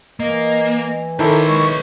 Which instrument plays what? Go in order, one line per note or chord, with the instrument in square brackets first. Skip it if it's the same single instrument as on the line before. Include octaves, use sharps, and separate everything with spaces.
[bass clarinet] E3 [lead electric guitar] A#3 [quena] D#5
[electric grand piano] D#3 E4 [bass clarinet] A4 [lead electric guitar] B4 C#5 [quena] A#5
[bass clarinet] G#3 [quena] C#6